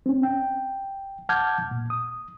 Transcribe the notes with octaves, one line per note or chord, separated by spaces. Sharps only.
C4 C#4
G5
F#5 A5 D6 F6 G6 G#6
A#2
D#6